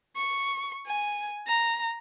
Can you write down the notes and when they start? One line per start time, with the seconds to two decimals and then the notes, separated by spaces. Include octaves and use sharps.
0.16 C#6
0.86 G#5
1.47 A#5